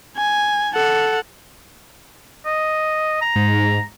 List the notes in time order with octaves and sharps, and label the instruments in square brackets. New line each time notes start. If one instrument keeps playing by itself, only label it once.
[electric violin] G#5
A4 F#5
[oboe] D#5
A#5
[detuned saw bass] G#2